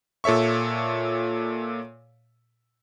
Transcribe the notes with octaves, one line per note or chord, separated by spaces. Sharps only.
A#2 A4 C#5 E5 C#6